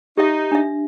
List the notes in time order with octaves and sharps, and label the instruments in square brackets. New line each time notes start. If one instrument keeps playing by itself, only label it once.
[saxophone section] D#4 [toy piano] G4 E5
[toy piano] D4 E5